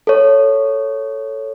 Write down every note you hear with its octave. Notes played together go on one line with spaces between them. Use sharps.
A4 C#5